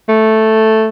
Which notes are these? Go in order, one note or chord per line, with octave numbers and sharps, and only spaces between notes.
A3